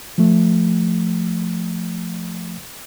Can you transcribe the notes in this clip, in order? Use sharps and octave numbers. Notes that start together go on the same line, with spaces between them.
F3 A3